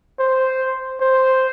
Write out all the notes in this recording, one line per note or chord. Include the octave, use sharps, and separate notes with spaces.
C5
C5